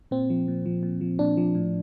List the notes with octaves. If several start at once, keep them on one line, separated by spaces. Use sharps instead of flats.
A#2 C4
F3
A#2
F3
A#2
F3
A#2 D4
F3
A2